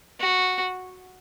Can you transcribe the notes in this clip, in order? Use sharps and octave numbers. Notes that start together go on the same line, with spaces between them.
F#4